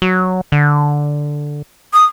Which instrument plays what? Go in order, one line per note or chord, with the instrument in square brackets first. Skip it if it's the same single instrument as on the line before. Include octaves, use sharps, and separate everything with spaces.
[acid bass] F#3
D3
[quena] D#6